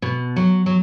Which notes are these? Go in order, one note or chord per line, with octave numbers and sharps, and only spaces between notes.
B2
F#3
F#3